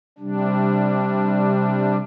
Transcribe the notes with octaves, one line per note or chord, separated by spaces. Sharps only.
C3 G3 D4